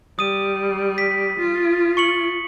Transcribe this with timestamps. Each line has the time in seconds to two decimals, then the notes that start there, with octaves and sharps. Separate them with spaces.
0.19 G3 D#6 D#7
0.98 B6
1.39 F4
1.97 C#6 C#7 F#7